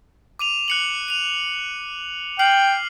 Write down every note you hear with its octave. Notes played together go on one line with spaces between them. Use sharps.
D6 D#7 F7
F#6 C#7 F#7
D#7 F7
G5 F6 C7 F#7